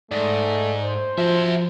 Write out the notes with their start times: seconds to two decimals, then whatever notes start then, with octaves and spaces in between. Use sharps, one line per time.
0.11 G#2 A3 D5
0.85 C5
1.18 F3 F#4 E5